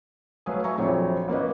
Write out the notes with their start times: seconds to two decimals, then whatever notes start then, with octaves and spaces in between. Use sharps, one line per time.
0.46 F#3 A3 B4 F5 G#5 D#6
0.64 E5 G#5 A#5 C#6
0.78 A#1 F2 F#3 C#5
1.28 A1 A#3 B4 D#5